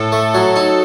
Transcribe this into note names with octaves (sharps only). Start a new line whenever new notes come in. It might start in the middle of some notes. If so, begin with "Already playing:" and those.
Already playing: A2 A4
A3
F#3
D#4